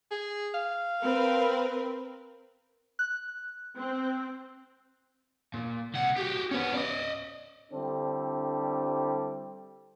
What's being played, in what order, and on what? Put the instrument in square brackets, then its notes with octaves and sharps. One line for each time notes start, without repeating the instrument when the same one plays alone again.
[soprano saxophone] G#4
F5
[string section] C4 A#4 B4
[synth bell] F#6
[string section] C4
[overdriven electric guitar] A#2
C2 F#5
F#4 G4
B3 C#4
D5 D#5
[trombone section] D3 G3 C4 D4 E4 A4